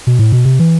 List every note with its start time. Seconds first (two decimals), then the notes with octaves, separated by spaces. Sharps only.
0.07 B2
0.19 A2
0.32 B2
0.45 C3
0.60 E3